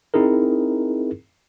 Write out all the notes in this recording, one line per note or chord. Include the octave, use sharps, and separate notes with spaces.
C4 D#4 E4 G#4 A#4